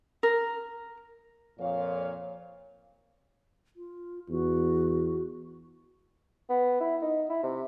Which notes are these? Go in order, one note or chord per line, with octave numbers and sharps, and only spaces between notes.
A#4
F2 A#2 C#5 F5
F4
E2 F#4
B3
E4
D#4
E4
C3